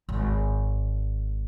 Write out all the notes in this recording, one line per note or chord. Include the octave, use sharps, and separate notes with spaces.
G#1 G#2